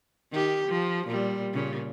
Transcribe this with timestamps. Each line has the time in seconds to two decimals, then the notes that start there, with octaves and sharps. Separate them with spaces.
0.32 D#3 G4
0.68 F3
1.07 A#2 G3
1.53 A#2 C#3